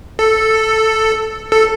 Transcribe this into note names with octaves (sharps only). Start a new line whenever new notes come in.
A4
A4